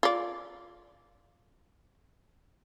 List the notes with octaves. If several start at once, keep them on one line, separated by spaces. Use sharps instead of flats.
F4 D5